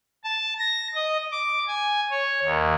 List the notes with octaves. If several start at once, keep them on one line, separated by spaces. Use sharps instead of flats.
A5
A#6
D#5
D6
G#5
C#5
D#2